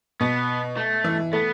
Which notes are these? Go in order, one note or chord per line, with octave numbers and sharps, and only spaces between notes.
B2 B3
A3
E3
A3 B3